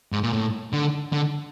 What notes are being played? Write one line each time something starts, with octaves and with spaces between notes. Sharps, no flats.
G#2
A#2
A2
D3
D3